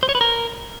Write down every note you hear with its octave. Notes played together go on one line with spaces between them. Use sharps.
C5
C#5
B4
A#4